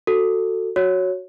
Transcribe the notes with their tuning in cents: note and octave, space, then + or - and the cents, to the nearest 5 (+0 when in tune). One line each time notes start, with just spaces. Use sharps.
F#4 +0 A4 +15
F#4 +0 C#5 +0